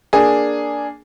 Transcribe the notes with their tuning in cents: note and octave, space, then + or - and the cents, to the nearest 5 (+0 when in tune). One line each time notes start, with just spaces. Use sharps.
A#3 +0 D4 +0 G#4 +0